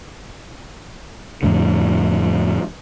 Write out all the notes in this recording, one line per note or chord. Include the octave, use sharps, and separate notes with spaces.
F2 A2 D3